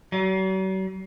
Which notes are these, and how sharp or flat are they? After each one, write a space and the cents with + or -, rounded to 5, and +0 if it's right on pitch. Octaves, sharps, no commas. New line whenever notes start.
F#3 +45